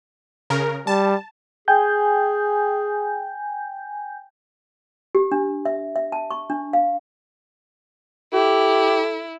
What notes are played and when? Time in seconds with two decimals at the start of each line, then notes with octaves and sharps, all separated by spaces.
0.50 C#3 A#4
0.87 G3 A5
1.68 G#4 G5 G#5 G6
5.15 G4
5.32 D4
5.65 E5
5.96 E5
6.12 A5
6.31 C#6
6.50 D4
6.73 F5
8.33 E4 G4 A4